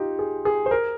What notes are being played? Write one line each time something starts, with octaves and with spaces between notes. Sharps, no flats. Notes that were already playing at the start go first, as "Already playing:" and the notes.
Already playing: D#4 F4 G4
G#4
G#4
C5
A#4